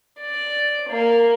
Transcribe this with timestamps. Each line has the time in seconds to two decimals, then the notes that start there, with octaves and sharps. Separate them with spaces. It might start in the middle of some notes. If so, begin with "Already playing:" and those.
0.21 D5
0.89 A#3